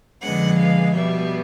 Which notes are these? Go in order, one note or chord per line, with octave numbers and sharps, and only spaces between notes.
F2 D3 F3 G#3 B3 F#5
F5
B2 G3 B3 E5